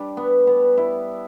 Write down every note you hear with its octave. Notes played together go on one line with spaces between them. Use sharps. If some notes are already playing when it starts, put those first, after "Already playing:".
Already playing: G3 D4
B3
B3
E4